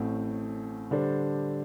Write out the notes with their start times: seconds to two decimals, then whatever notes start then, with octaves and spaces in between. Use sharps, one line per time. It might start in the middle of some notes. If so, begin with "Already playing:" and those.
Already playing: A1 A2 A3 C4
0.91 D3 G3 D4 A4 C5